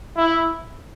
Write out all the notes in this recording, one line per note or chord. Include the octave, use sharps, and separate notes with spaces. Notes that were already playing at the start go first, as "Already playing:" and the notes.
E4